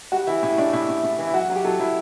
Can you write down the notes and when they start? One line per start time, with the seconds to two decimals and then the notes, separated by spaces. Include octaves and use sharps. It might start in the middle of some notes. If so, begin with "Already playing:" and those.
0.12 G3 F#4
0.27 E3 E4
0.43 A2 E4
0.58 A2 D4
0.73 A2 E4
0.89 A2
1.03 A2
1.19 E3
1.27 E4
1.33 F#3 F#4
1.50 F#3
1.56 G4
1.64 F#3 A4
1.80 F#3 E4